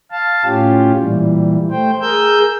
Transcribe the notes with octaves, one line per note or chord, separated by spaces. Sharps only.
F5 A5
A2 C#4 F4 G4
A#2 E3 G3
A3 C5 G5
G#4 A#4 E6 G6